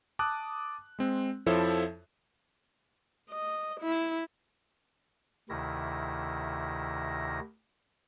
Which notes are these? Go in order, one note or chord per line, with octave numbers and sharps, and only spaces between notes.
A5 D6 D#6 F#6
G#3 C4
F2 F3 E4 A4 C#5 E5
D#5
E4
D2 C3 D#3 E4 A#6